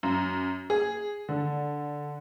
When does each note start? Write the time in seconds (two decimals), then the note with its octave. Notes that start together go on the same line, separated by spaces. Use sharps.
0.03 F#2
0.70 G#4
1.29 D3